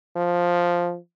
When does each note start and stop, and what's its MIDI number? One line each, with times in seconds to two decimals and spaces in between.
0.16 0.97 53